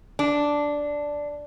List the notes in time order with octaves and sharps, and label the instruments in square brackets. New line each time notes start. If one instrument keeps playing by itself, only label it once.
[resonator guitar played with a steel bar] D4